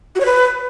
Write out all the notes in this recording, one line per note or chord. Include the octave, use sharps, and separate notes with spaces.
F#4
C#5
B4